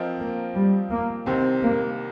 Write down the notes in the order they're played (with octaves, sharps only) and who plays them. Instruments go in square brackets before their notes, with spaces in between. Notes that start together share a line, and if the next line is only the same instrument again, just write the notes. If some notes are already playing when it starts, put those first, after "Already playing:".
Already playing: [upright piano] F3 C4 F4 A#4 D#5
[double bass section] A#3
G3
A#3
[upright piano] C2 C3 D#3 [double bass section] C4
[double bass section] A#3